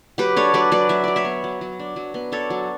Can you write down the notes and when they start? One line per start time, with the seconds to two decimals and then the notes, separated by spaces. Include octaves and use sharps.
0.18 F#3 G4 B4
0.36 D4 A4 C#5
0.54 F#3 B4 D5
0.72 F#3 B4 D5
0.89 F#3 E5
1.04 F#3 D5
1.16 C#5 E5
1.25 B3
1.44 F#3
1.61 F#3
1.80 D4
1.96 F#3
2.14 B3
2.32 D4 A4 C#5
2.50 F#3